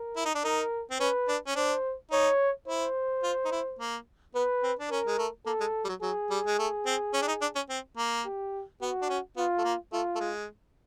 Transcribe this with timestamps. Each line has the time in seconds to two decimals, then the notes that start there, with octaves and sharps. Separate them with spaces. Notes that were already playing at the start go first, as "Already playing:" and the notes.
Already playing: A#4
0.17 E4
0.25 D#4
0.35 D4
0.44 D#4 A#4
0.91 C4
1.00 C#4 B4
1.28 D4
1.47 C#4
1.56 D4 C5
2.12 D#4 C#5
2.67 E4 C5
3.24 F4
3.45 D#4
3.52 E4
3.79 A#3
4.35 B3 B4
4.63 C4
4.79 D4
4.90 C#4 A#4
5.07 G#3
5.18 A3
5.46 A#3 A4
5.60 G#3
5.85 G3
5.89 F#3
6.02 F#3 G#4
6.30 G3
6.47 G#3
6.59 A3
6.86 C4
7.14 C#4
7.22 D4
7.28 D#4
7.42 D4
7.56 C#4
7.70 C4
7.98 A#3
8.25 G4
8.81 B3 F#4
9.02 D4
9.10 C#4
9.37 B3 F4
9.58 A3
9.65 A#3
9.93 A3 F4
10.16 A3
10.20 G#3